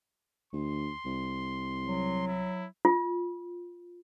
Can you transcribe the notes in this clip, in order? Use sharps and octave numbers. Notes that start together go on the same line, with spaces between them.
D2 C6
C2
F#3
E4
F4